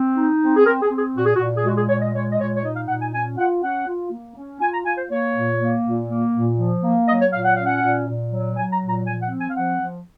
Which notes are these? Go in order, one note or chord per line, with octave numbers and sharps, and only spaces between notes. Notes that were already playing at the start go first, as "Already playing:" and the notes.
Already playing: C4
D#4
C4
G#4
C4 A#4
G#4
C4
G#4
A#2 F#4
G#4
F#4
A#2
G#4
G#3 F#4
G#4
A#2 C#5
D#5
G#3 C#5
D#5
A#2 C#5
C#5
D#4 D#5
F5
A#2 F#5
G#5
C#4 G#5
F4 F#5
C#4 F#5
F4
A#3
C#4
F4 G#5
A#5
F4 G#5
C5
A#3 C#5
A#2
A#3
A#2
A#3
A#2
F3
A#3
F#3 D#5
C#5
A#2 F5
F#5
C#4 F5
F#5
A#2
A#2
F#3
F#3 G#5
A#5
A#2
A#5
F3 G#5
F#5
C4
G#5
F5
F3 F#5
F3